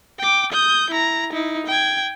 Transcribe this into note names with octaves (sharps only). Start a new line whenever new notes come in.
G5 D6
D#6 G6
E4 A#5
D#4 E4
G5 G#6